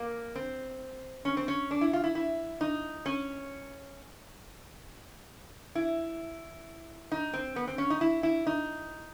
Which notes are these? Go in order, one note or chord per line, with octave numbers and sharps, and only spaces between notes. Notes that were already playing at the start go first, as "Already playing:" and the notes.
Already playing: A#3
C4
C#4
C4
C#4
D4
E4
F4
E4
E4
D#4
C#4
E4
D#4
C4
B3
C4
C#4
D#4
E4
E4
D#4